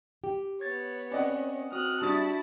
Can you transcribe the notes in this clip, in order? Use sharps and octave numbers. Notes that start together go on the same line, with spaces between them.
G4
B3 C#5 G#6 A6
C4 C#4 D5 D#5 F#5
C4 F#4 D#6 F6 F#6
G3 D4 E4 F#4 A5 C#6 D#6 A6